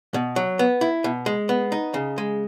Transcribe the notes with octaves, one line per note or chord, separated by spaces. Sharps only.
B2
F#3
B3
E4
B2
G#3
B3
D#4
C#3
G#3